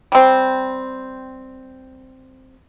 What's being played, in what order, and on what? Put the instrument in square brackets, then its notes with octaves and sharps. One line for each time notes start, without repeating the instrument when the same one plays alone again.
[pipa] G3 C4